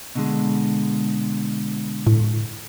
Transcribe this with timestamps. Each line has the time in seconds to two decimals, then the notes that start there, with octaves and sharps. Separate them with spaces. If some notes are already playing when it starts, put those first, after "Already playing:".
0.15 B2 D3 G#3
2.07 A2